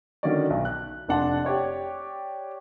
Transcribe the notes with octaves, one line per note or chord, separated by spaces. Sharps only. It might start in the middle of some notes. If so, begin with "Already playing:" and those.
D3 D#3 C#4 F#4 C#5 D5
B1
F#6
F1 D4 F#5 A5 C6
G4 C#5 D5